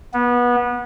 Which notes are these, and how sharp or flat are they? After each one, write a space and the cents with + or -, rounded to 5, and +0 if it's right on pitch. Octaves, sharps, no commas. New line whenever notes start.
B3 -25